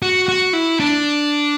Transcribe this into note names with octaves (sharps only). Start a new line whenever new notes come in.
F#4
F#4
E4
D4